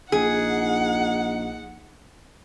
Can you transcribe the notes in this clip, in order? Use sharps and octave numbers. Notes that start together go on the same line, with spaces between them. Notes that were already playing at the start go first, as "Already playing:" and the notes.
A#1 D#4 G#4 F#5